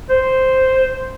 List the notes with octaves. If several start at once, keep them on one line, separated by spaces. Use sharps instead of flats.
C5